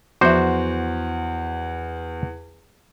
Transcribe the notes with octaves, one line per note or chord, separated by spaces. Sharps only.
E2 F3 F#4 C5 E5